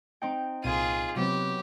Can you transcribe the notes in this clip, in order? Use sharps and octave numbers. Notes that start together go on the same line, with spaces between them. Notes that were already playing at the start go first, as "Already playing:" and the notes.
C4 D#4 G5
C2 A#2 F4 G#4 D#7
C3 F#3 B3 C4 G4